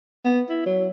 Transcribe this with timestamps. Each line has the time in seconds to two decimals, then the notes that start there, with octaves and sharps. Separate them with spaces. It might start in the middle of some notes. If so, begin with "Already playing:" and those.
0.25 B3
0.49 E4
0.66 F#3